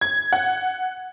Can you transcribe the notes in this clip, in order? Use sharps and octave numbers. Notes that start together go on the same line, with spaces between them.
G#6
F#5